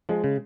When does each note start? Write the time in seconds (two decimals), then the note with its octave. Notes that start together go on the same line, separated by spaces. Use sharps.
0.09 F3 G#3
0.24 C#3